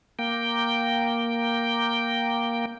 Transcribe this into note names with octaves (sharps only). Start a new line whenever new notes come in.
A#3 G5